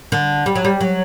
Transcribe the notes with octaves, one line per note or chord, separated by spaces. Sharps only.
D3
G3
F#3
G3
F#3